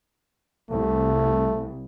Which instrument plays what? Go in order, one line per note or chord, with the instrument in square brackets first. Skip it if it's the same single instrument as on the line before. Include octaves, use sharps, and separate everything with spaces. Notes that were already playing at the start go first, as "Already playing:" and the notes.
[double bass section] C2 [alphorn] A3